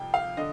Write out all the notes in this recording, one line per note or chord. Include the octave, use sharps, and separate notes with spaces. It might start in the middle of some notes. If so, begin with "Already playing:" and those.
Already playing: F2 C3 G5
F5
D3 D#5